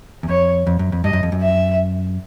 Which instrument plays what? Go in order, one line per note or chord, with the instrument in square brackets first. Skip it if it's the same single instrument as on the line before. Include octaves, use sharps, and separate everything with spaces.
[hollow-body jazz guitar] E2
[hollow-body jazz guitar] F2 [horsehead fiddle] C#5
[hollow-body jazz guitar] F2
F#2
F2
[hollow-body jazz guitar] G2 [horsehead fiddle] D#5
[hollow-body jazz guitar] F#2
F2
F#2
[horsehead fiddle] E5